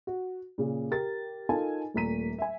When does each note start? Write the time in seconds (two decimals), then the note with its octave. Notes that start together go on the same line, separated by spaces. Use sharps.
0.07 F#4
0.58 A#2 C#3
0.91 G4 A#4 A6
1.49 D#4 F4 A4 A#4 G#5 A5
1.94 D#1 A#2 A3 A#5 B6 D#7
2.38 E5 G#5